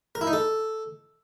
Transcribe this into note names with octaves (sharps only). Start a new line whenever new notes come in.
A#4
E4
D#4
A4